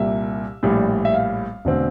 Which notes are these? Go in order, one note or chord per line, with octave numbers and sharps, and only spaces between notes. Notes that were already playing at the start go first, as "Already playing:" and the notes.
Already playing: C2 A#2 G3 E5
A#1 A2 G3
E5
F5
E1 D3 A3 C4